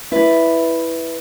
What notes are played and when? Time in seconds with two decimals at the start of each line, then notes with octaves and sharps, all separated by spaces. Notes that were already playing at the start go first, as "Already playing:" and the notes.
0.12 E4 B4 D5